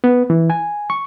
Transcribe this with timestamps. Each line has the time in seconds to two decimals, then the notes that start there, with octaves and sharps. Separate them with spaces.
0.04 B3
0.30 E3
0.50 G#5
0.90 C#6